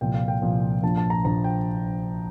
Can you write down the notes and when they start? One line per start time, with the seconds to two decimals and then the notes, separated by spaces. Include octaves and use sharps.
0.01 C2 A#2 F3 G5
0.14 F5
0.28 G5
0.42 C2 A#2 F3
0.82 A#1 A#2 F3 A5
0.97 A5
1.10 A#5
1.24 A#1 A#2 F3 A#5
1.44 G5